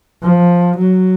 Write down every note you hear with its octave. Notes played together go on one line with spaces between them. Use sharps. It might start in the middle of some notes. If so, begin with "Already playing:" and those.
F3
F#3